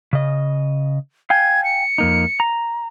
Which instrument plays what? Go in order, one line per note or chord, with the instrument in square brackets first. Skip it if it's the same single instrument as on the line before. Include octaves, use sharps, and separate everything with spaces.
[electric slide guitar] C#3 D#5
[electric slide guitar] F5 G5 G#5 [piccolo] G#6
[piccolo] C#7
[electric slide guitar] F2 A#3 D#4
A#5